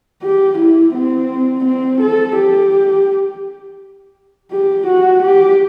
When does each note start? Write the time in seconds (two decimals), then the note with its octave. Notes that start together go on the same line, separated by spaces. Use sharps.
0.23 G4
0.58 E4
0.94 C4
1.65 C4
2.01 A4
2.37 G4
4.52 G4
4.87 F#4
5.23 G4